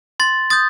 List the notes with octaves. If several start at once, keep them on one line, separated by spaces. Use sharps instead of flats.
C6 A6
D#6 G6 A6